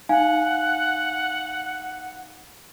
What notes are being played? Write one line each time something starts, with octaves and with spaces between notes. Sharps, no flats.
D#4 F5 F#5 G#5